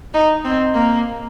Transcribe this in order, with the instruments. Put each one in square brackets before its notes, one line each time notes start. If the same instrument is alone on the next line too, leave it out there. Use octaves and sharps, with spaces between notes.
[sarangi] D#4
C4
A#3